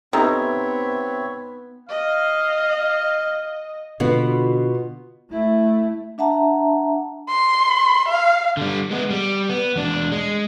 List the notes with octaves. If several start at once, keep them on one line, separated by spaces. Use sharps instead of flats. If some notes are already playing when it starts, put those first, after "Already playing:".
C3 B3 C4 D#4 A4 C#5 E5 A#5
D#5 F5
B2 D3 B3 F4
A3 E4
D4 E5 F#5 A5 A#5
C6
F5
D3 G3
G#3 B3
G3
B3
E2 D4
G#3